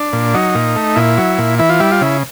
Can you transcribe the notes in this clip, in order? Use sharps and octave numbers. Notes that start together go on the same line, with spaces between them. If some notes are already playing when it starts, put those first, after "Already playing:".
Already playing: D4
A#2
F#3 D#4
A#2
A3
A#2 E4
F#3
A#2
E3 E4
F4
G3 E4
F4
C#3 E4